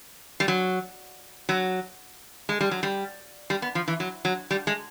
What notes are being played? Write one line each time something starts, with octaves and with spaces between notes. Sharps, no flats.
G3
F#3
F#3
G#3
G3
F#3
G3
G3
B3
F3
E3
F#3
F#3
G3
G#3